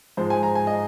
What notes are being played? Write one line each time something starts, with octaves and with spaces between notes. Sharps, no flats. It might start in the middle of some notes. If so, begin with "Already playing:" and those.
G#2 F3 G#3 C5
G#5
A#5
G#5
D#5